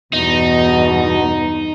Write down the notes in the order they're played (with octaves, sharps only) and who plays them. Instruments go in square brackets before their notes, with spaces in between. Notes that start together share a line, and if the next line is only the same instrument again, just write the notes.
[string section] E2 G2 [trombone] B2 [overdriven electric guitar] D#4